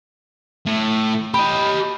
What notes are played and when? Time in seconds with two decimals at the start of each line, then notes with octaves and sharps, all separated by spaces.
0.66 A2
1.34 G4 D#5 B5